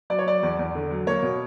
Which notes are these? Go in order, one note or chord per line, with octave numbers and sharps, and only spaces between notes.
F#3 D5
C#5
F#3 D5
E2
E2
D3
F#3
A#3 C#5
B2